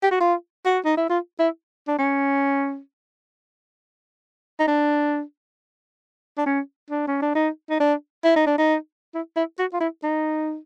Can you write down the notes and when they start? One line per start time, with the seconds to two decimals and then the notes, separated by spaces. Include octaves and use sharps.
0.03 G4
0.11 F#4
0.20 F4
0.65 F#4
0.85 D#4
0.97 E4
1.09 F4
1.39 E4
1.88 D4
1.98 C#4
4.59 D#4
4.67 D4
6.37 D4
6.46 C#4
6.90 D4
7.07 C#4
7.22 D4
7.35 D#4
7.70 D#4
7.80 D4
8.24 E4
8.36 D#4
8.47 D4
8.58 D#4
9.14 E4
9.36 E4
9.59 F#4
9.73 F4
9.80 E4
10.03 D#4